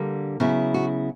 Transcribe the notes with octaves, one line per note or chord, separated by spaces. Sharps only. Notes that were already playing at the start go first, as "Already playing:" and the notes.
Already playing: D3 G3 A#3
C#3 F#3 B3 E4 F#4
F#4